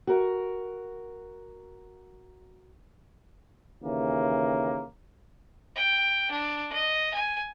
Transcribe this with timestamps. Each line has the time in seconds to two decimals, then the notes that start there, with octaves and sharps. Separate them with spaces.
0.07 F#4 A#4
3.83 D#2 C#3 E3 A#3
5.75 G5
6.31 D4
6.72 D#5
7.14 G#5